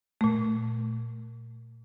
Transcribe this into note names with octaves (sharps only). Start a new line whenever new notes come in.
A#2 A3